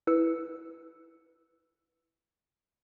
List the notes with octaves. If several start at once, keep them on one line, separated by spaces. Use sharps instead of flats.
E4 B4 E6 C#7